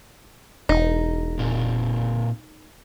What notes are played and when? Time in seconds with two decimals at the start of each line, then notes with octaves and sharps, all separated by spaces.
0.69 E1 D#4
1.39 A#2 A#3 C4